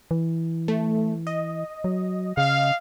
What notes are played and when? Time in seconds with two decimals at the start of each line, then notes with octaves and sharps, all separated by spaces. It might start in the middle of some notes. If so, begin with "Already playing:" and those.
0.11 E3
0.68 A3
1.27 D#5
1.84 F#3
2.37 C#3 F5